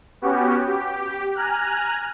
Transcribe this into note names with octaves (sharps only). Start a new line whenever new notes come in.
B3 C#4 F#4 G4
G4
G#5 A#5 F6 F#6